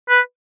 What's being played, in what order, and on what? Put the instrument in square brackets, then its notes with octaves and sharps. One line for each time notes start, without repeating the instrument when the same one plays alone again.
[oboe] B4